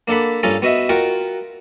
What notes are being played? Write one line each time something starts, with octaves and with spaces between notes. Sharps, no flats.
A#3 D4 A4 F#5 B5
G2 C#4 F4 A4 A#5
B3 F#4 D#5 E5
F4 F#4 A#4 F#5 G5